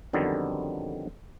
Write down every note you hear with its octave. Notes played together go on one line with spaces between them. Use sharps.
F2 D3 D#3 F#3 G3 B3